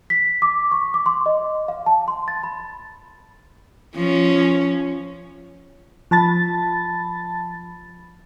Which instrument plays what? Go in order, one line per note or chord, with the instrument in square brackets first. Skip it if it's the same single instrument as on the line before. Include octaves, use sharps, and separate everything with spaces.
[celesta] B6
D6
C#6
D6
C6
D#5
F5
A5
C6
A6
B5
[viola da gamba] F3 C#4
[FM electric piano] F3 A5 B5 A6